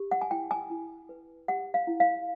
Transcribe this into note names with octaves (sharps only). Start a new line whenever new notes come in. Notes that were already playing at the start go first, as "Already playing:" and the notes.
Already playing: G4
F#5
G#5
E4 G5
G#5
E4
B4
G4 F#5
F5
E4
F5